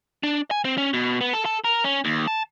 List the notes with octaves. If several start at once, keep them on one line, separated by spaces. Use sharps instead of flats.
D4
G#5
C4
C#4
B2
B3
A4
A4
A#4
C#4
D#2
A5